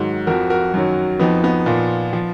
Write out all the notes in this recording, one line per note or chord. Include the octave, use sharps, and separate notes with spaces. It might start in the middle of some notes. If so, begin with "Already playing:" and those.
Already playing: G#2 D#3 F#3 F#4
F2 F3 F#4 A#4
F#4 A#4
F#2 D#3 F#3
F2 F3 B3 D#4
B3 D#4
A#2 F3
F3